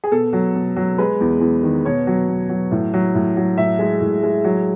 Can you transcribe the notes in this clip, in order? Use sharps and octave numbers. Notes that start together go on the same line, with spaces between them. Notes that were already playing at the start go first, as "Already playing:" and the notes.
G#4
B2 A4
F#3
B2
F#3
G#3 B4
E2
E2
D#3
B2 C#5
F#3
B2
F#3
A2
F#3
A2
F#3
A2 E5
G#3
A2
G#3
F#3